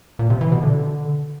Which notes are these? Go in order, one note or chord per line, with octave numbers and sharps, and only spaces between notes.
A#2
C3
E3
B2
D3